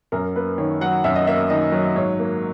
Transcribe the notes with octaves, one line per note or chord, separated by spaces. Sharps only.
F#2 A#4
A#3 B4
D#3 C#5
F#3 F#5
F#2 E5
D#5
A#3 E5
D#3 D#5
F#3
G#2 C#5
A#3